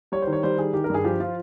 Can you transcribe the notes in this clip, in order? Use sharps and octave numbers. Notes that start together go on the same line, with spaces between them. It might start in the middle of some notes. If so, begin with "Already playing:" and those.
G3 C#5
C5
D#3
C#5
G3 C5
D#3 G#4
D#3 G4
A#4
G2 G#4
F3 G4
F3 F4